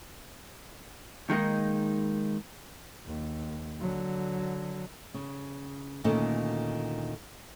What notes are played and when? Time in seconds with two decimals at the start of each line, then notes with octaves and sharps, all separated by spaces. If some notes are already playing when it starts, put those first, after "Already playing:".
1.30 D#3 G#3 A#3 D#4
3.06 D#2
3.81 D3 F#3
5.14 C#3
6.04 D2 A#2 D#3 C#4 A4